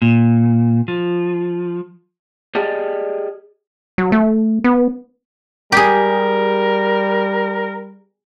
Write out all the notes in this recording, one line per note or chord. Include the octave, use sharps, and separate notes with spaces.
A#2
F3
G4 G#4 D5 D#5 G5 A5
F#3
A3
B3
G3 G4 G#4 A#4